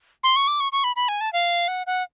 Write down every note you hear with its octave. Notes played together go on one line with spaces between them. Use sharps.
C6
C#6
D6
C#6
C#6
B5
B5
G#5
A5
F5
F#5
F#5